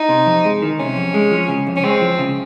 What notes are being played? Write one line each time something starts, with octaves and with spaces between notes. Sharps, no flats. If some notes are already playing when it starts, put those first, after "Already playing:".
Already playing: D#4
C3
F2
G#3
D#3
C3 C#4
F2
G#3
F3
C#3
F2
C#4
G#3 C4
F3
C#3